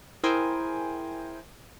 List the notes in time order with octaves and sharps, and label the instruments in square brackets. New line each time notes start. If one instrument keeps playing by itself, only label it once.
[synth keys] E4 G#4 A#4 C5 G5 G#5